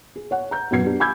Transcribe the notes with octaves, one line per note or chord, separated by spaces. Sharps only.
G#4
C#5 F#5
A#5 G6
F#2 B2 F#3 B3 G#6 C7
B3 D4 G4
G#5 B5 D6 E6 G6 G#6